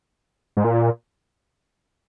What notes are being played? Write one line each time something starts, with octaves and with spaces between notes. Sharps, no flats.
G#2
A#2